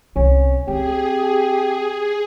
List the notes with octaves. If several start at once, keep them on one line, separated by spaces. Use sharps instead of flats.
C2 C4 C#4
C4 G4 G#4